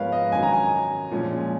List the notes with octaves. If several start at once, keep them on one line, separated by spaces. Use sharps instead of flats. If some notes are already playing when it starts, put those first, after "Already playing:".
Already playing: G#2 F3 G#3 B3 A#4 B4 C#5 F5
D#5
F#2 D#3 F#3 C#4 G#5
A#5
G#5
A#2 F3 G#3 C#4